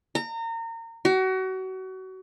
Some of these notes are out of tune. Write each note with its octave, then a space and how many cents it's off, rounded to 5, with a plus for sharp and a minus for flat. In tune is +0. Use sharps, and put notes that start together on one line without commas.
A#5 -30
F#4 +30